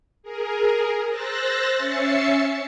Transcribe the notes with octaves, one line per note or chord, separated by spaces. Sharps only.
G#4 A#4
C5 E6 F#6 A6 A#6
C#4 E5 A6 C7 C#7